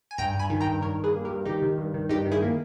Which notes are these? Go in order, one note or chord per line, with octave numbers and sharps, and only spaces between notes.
G#5
G2 G5 A#5
G2
G#5 B5
D#3
G5 A#5
G2
D#3 A#4 C#5
G2
G#4 B4
A#3
G4 A#4
G2
D#3 D#4 G4
D#3
G2
D#3
G2 D#4 G4
D#3
E4 G#4
A#3